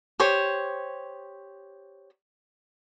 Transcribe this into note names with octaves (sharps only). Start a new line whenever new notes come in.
G4 C5 C#5